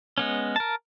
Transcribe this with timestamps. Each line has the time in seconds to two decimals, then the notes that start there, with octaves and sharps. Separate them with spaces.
0.18 G#3 B3 C#4
0.56 A#4 A5